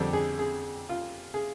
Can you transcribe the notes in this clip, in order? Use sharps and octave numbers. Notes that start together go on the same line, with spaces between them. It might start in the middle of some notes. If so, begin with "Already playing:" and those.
Already playing: F2 D3 G3 D4 G4
G#4
G#4
F4
G#4